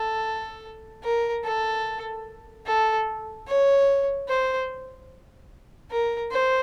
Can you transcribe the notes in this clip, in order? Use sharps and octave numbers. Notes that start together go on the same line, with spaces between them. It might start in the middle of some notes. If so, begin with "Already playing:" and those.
Already playing: A4
A#4
A4
A4
C#5
C5
A#4
C5